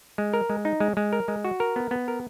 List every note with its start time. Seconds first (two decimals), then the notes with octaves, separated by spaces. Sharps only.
0.18 G#3
0.33 A#4
0.50 G#3
0.65 D#4
0.80 G#3
0.97 G#3
1.13 A#4
1.28 G#3
1.45 F#4
1.60 A#4
1.76 B3
1.91 B3
2.08 A#4